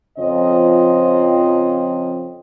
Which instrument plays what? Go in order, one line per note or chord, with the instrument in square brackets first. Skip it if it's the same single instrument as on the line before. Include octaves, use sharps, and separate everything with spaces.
[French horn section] F2 C#3 F3 C4 D#5